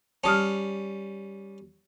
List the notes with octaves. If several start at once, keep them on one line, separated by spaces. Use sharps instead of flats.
G3 C#4 A5 D#6 F6